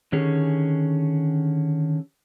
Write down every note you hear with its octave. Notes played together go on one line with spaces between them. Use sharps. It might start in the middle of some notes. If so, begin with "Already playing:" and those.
D3 D#3 C#4 G4 G#4